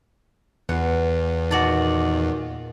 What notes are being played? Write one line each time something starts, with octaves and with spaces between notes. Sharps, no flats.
E2 B3 F4 F#5
A#2 D#3 F#4 D5 A5